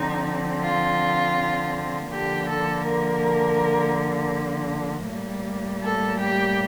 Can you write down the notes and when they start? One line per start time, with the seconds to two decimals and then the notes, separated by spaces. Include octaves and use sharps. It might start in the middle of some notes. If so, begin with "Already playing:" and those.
Already playing: D3 F3 C4 D#4
0.63 F4
2.11 D3 F3 A#3 G4
2.49 A4
2.86 A#4
5.09 A2 G3 A#3
5.83 A4
6.21 G4